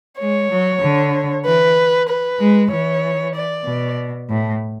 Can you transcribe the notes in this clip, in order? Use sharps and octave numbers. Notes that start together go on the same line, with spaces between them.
G#3 C#5
F#3
D3
E3 B4
B4
G#3
E3 C#5
D5
B2
A2